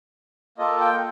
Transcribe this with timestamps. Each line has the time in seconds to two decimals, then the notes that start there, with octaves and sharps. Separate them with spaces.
0.58 A#3 F4 A4 D#5
0.80 G5